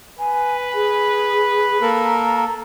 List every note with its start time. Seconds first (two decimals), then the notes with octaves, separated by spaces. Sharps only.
0.19 B4 G#5
0.74 G#4
1.81 A#3 A4 A#4 A#5